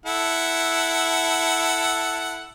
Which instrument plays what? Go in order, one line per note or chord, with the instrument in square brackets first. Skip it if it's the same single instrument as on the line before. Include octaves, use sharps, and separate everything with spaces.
[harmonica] E4 A4 F#5